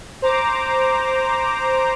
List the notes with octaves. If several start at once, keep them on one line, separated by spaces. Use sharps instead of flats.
C5 A#5 D6